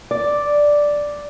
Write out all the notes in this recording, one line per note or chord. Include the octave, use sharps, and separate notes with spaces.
D5